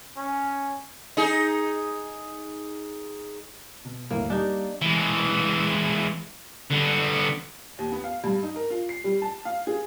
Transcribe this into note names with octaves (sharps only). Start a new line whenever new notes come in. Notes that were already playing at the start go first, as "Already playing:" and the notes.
C#4
D#4 G#4
B2
G1 D#2 A2 A#3
G3 D4 D#4 G4
E3 G#3
D3 B3
D#2
B3
F5
G2
D#4
A#4
F4
C7
G3
A5
F5
G#4